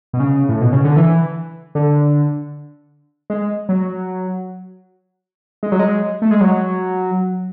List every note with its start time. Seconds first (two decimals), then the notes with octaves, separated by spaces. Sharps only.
0.13 B2
0.20 C#3
0.49 A2
0.61 B2
0.73 C#3
0.85 D3
0.96 E3
1.75 D3
3.30 G#3
3.69 F#3
5.63 G#3
5.72 F#3
5.79 G#3
6.22 A3
6.31 G#3
6.41 F#3